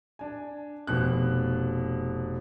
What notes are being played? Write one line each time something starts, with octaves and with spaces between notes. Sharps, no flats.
D4 G#5
F1 B2 F#6